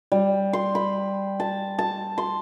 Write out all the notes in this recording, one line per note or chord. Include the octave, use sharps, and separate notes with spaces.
G3
C6
B5
A5
A5
C6